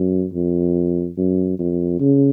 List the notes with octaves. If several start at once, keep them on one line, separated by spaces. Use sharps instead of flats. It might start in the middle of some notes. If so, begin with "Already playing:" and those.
Already playing: F#2
F2
F#2
F2
C#3